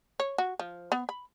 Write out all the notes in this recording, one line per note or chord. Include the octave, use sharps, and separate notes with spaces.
C#5
F#4
F3
B3
B5